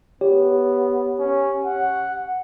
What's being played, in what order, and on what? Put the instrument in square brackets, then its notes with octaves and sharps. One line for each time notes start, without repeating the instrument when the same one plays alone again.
[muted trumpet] B3 [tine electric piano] G4 C#5
[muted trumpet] C#4
F#5